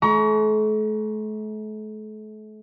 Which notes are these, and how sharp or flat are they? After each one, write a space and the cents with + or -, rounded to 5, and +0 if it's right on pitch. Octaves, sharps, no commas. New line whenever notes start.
A3 -40 A#5 +30 C#6 +35